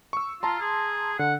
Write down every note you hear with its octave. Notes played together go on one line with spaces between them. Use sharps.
C#6 E6
F4 A5 A#5 C6
G#4
D3 F#5